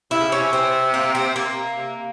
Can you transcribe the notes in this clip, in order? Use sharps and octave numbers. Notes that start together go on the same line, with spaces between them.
C3 E4
C#3
C3 C#4
C4
A#3
C4
A#3
C3